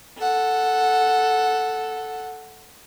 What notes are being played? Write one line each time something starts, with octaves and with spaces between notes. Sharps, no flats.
A4 F#5